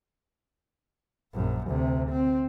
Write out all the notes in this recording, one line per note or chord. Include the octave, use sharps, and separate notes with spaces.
A#1 F#2
D2 C3
C4